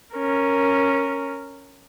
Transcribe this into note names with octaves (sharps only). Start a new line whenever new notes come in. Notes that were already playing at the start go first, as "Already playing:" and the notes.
C#4 A#4